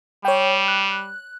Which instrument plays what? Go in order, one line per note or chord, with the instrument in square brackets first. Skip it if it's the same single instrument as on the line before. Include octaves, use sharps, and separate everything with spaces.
[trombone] G3 [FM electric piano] C#5 G5
[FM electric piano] F#6